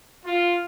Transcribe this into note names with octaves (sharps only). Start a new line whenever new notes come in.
F4